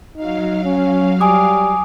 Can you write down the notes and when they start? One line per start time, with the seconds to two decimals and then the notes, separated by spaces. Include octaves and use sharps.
0.16 F#3 D#4 F5
0.65 C#4
1.21 G3 G#5 D6 D#6